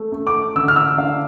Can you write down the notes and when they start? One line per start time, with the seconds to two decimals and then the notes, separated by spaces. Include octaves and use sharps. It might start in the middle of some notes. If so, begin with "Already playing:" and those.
Already playing: A3
0.12 A3
0.27 D6
0.56 D3 E6
0.68 F6
0.76 E6
0.98 D4 F5